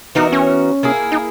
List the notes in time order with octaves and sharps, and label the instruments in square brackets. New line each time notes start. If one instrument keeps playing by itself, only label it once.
[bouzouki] E3 B3 F#4 A#4 [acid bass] D#4
[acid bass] C#4
[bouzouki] A#3 E4 G#4
[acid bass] D#4